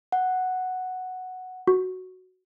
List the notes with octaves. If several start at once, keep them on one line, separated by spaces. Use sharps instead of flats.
F#5
F#4